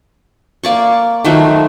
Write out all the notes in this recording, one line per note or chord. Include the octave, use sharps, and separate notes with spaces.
A#3 D5 C#6
D#3 F3 F#3 A3